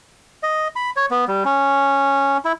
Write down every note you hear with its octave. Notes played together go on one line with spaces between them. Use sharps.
D#5
B5
C#5
B3
G3
C#4
E4